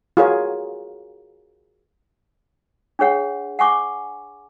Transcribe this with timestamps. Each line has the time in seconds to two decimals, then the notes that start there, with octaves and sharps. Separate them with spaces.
0.17 F4 F#4 G#4 A#4 C#5
2.99 D4 G#4 C#5 F#5
3.59 F#5 G#5 C#6 D6